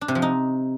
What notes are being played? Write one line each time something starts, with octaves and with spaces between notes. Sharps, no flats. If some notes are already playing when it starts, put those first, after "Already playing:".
D4
C3
F3
D#4